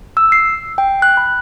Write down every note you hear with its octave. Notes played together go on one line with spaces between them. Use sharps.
E6
C7
G5
F#6
B5